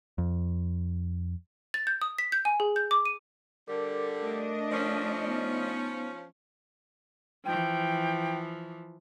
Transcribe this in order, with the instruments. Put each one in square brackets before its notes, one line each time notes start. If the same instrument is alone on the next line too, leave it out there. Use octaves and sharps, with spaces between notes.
[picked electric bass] F2
[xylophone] A6
G6
D#6
B6
G6
G#5
G#4
G6
D6
D#7
[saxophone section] D3 G3 [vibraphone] A#4 D6
[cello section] A3 D4 D#5
[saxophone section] F3 C#4
[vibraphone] B3 D#4
[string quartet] E3 F3 [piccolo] G5